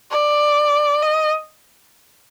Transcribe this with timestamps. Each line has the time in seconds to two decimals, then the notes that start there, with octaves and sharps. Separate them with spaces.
0.11 D5
1.02 D#5